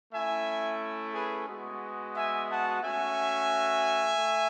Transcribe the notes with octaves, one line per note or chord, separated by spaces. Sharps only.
A3 C#4 E4 E5 G#5
G#4 B4
G#3 B3 F#4
E5 G#5
F#5 A5
A3 C#4 F#4 E5 G#5
A3